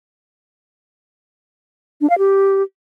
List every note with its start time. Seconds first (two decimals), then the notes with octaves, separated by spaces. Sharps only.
2.01 D4
2.10 F5
2.18 G4